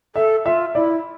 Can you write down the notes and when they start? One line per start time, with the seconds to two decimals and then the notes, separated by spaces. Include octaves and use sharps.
0.15 A4 E5
0.45 F4 E5
0.74 E4 D5